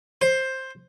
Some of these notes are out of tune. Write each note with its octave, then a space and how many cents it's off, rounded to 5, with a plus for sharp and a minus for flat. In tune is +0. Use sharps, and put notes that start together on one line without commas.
C5 +10